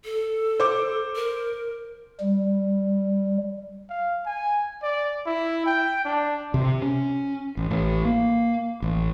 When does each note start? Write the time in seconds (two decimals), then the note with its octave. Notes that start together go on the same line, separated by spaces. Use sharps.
0.05 A4
0.60 C5 D6
1.15 A#4
2.20 G3
3.90 F5
4.26 G#5
4.83 D5
5.26 E4
5.66 G5
6.05 D4
6.54 C3
6.82 C#4
7.57 A1
7.71 A1
8.05 A#3
8.82 A1